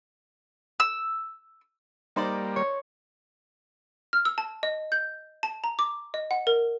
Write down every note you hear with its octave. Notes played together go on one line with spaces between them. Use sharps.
E6
G3 A#3 D#4 C5 D5
C#5
F6
E6
A5
D#5
G6
A5
A#5
D6
D#5
F#5
A#4